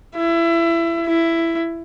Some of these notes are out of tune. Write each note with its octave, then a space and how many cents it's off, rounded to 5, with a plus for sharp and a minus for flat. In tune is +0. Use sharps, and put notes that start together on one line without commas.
E4 +25
E4 +10